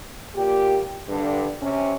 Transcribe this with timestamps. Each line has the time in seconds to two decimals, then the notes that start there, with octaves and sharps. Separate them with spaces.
0.35 A#2 G4
1.09 G2 D3
1.61 C3 C#4